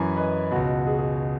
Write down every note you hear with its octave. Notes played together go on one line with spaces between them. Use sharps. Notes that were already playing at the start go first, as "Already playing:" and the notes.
Already playing: F#2 E3 G#5 B5
B4 D#5
C#2 B2 F#4
G#4
G#4